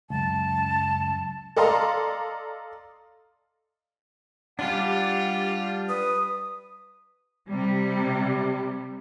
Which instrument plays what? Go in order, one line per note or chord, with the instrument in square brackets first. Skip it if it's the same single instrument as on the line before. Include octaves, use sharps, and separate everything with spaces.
[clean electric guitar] C#2 F#2 [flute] A5
[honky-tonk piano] A4 D5 D#5 F5 A#5 C6
[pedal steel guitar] G3 D4 [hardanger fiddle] F4 G4 [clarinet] F#5
[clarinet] B4 [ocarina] D#6
[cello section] C3 G3